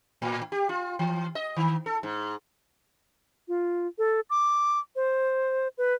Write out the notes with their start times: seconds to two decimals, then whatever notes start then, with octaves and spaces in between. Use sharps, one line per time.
0.22 A2
0.52 G4
0.69 F4
0.99 E3
1.35 D#5
1.57 D#3
1.86 A4
2.03 G#2
3.48 F4
3.98 A4
4.30 D6
4.96 C5
5.78 B4